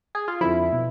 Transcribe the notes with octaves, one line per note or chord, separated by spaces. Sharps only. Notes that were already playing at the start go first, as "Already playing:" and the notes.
G#4
F4
F2 D3 F3 E4
B2